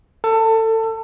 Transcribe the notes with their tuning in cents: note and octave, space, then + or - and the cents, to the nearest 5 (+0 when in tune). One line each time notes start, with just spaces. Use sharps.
A4 +25